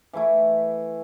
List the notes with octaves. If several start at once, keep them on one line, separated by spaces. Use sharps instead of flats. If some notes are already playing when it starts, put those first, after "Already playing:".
E3 A3 E4